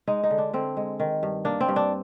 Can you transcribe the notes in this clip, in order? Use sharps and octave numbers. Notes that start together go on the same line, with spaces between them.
G#3 D#4
D#4
D3
D4
D3 C4
G#3
D#3
G2
A#3 D4
C4
G2
D4